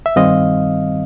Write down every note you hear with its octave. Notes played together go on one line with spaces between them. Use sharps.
E5
G2 D#3 G3 C4 D#5 F5